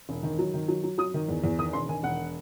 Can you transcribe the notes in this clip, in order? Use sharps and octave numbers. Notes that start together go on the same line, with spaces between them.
E1
D#3
F#3
D#3
F#3
F#3
F#3 D#6
D#3
E2
E2
D#3 D#6
E1 C6
D#3 G#5
E1 F#5